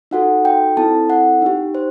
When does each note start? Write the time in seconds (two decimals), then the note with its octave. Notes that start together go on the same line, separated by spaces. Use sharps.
0.11 D#4 F#4 A4 F#5
0.45 G5
0.77 C4 E4 A4 A5
1.10 F#5
1.42 D#4 G4
1.75 C5